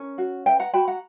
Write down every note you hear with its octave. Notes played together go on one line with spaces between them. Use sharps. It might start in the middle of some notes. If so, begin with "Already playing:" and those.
Already playing: C#4 A#4
F#4
B4 E5 G5
F#5 A#5
F#4 G5 B5
F#5 A#5